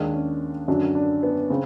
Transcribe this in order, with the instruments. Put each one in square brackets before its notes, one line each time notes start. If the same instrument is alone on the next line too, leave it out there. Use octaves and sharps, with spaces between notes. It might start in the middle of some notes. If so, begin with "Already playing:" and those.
Already playing: [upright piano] D#2 D#3 G#3 [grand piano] D4
[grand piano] C#4
[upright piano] F#2 D3 F#3 [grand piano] D4
[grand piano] D4
B3
[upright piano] C#3 [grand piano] C4